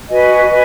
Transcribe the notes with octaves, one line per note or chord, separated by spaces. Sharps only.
F#4 B4 D#5 G#5
B4 D#5 G#5